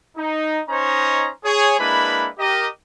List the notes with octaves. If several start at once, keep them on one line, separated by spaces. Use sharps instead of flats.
D#4
C#4 D#4 C5 C#5 D#5 A#5
G#4 C#5
G#3 A#3 D4 E4 B4 B5
G4 A#4 D#5